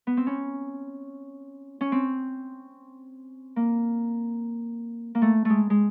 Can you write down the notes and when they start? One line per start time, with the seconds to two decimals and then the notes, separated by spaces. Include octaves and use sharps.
0.07 B3
0.17 C4
0.27 C#4
1.81 C#4
1.92 C4
3.56 A#3
5.15 A#3
5.22 A3
5.45 G#3 A3
5.70 G#3